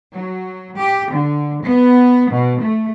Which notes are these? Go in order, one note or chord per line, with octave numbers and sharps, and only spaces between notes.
F#3
G4
D3
B3
B2
A3